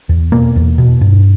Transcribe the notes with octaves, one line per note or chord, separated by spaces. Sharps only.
E2
B2 A#3
E2
B2
G2